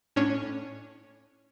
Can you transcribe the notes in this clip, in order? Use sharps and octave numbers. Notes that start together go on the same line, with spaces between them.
A2 C#4 D4 C#5